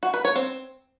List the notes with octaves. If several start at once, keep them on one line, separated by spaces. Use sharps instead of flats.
F#4
B4
C#5
C4